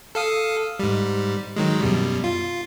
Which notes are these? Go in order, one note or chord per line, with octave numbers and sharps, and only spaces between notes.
A4 F5 D#6
G#2 G3
D#3 F#3 G#3
F#2 B2 G3
F4